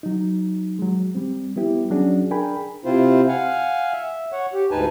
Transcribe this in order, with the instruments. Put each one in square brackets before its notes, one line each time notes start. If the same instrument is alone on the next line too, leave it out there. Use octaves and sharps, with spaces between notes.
[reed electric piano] F#3 D#4
F#3 G#3
G3 C4
G3 B3 E4 G4
F#3 C#4 D4 F#4 G#4
D4 G#4 A#4 G5 G#5 B5
[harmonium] C3 C4 E4 F4 C5
F5 F#5 G#5
E5
C#5 F#5
G4
D2 G#2 D#4 B4 G#5 A5